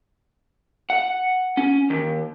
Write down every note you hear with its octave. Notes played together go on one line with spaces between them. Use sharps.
F#5
C#4
D#2